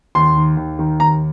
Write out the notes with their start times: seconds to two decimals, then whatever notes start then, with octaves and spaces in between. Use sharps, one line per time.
0.15 D#2 C6
0.36 D#3
0.57 D#2
0.79 D#3
1.00 D#2 A#5